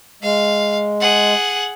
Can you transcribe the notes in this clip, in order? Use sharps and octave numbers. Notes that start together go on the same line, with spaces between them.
G#3 F5
G#4 F#5